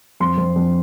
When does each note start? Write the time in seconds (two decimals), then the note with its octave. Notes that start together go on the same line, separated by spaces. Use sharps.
0.20 F2 C6
0.37 F2
0.56 F2